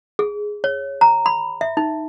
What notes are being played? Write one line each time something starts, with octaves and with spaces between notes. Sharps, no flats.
G#4
C#5
A#5
B5
E5
D#4